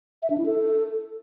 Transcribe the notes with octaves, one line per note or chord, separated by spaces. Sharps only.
E5
D4
E4
A4